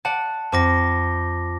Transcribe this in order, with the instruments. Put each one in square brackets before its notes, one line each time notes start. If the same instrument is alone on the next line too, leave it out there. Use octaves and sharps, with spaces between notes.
[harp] D5 F#5 [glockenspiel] A5
[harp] F2 [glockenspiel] A5 D6 A#6